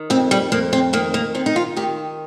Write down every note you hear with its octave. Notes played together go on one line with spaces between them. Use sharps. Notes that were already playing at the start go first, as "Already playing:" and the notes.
Already playing: D#3
F2 C4
G3
F2 A#3
C4
D#3 A#3
A#3
D#3 C4
D#4
F4
D#3 G4